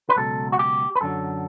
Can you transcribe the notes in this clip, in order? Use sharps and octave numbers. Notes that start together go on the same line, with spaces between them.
B4
C#2 B2 F#3 A4
F#4
G4
B4
F#2 D3 F#3 A4